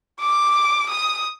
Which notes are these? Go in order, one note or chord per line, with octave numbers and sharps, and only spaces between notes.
D6
D#6